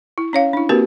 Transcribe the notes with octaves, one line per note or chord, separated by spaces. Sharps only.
E4
C#4 C#5 F5
D4 E4
A#3 C4 F#4 G4 A#4 B4